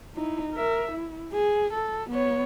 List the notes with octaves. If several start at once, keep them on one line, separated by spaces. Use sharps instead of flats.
D#4 E4
A#4 E5
E4
G#4
A4
B3 C#5